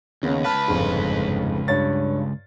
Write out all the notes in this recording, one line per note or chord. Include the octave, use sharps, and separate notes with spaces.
D#2 C#3 B3 C#4
C#2 B4 A5 B5 F6
G1 F2 G#2
G2 C#5 A6